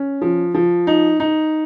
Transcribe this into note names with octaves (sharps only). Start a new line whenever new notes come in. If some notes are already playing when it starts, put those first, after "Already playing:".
Already playing: C#4
F3
F3
D#4
D#4